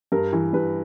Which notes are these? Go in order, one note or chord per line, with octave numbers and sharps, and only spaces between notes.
G2 A#4
E3
G2 B4